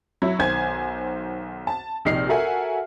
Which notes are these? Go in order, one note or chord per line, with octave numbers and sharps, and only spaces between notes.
F#3 E4
B1 D#3 C5 G#5 G#6
A5
A#1 C3 D#4 G4 F6 C7
F#4 A4 A#4 E5 F#5 G#5